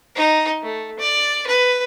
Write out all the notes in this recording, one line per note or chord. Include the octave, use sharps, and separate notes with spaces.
D#4
A3
D5
B4